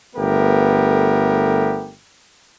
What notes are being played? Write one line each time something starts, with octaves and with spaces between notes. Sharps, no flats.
G1 A3 B3 G4 A#4